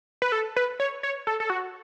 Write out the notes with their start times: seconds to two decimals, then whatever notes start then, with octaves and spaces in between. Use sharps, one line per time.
0.22 B4
0.32 A4
0.56 B4
0.80 C#5
1.03 C#5
1.27 A4
1.40 A4
1.50 F#4